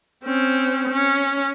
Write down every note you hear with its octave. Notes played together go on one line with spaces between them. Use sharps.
C4 C#4
C#4